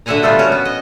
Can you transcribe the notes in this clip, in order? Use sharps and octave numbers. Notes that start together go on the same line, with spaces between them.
D3 F#4 E5 F#5 G#5 A#5
G3 A3 B3 F4
C#4 F#4 A#4
B3
D#5